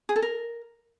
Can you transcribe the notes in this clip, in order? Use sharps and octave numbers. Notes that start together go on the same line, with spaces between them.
G#4
A4
A#4